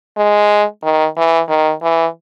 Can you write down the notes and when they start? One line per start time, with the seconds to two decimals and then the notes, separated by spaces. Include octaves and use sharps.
0.18 G#3
0.83 D#3
1.17 E3
1.49 D#3
1.83 E3